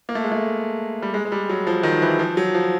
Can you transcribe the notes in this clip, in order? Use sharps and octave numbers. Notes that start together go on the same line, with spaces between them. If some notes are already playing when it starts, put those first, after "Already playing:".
A#3
A3
G#3
A3
G3
G#3
G#3
G3
F#3
F3
D#3
E3
F3
F#3
F3